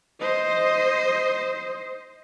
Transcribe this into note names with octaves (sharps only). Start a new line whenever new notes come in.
C5 D#5